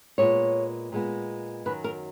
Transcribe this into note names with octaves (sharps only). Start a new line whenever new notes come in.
A#2 G#3 B3 C#5
A#2 G#3 B3
F#2 D#3 F#3 B4
A#4